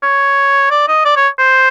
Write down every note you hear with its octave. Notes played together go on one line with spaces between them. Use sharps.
C#5
D5
D#5
D5
C#5
C5